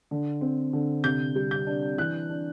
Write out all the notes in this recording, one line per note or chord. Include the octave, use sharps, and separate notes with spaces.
D3
C4
D3
C3 G6
G3
G6
D4
E3 F#6
D4